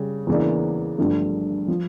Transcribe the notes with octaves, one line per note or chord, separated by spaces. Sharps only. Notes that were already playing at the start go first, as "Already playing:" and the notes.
Already playing: C#3 G3
E2 C#3 E3 A#3 D4
G1 G2 F3 A3
F3